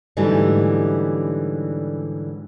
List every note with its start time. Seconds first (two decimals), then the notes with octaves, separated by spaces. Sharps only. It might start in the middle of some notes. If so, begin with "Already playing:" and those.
0.17 G#2 D3 E3 F#3 G3 A3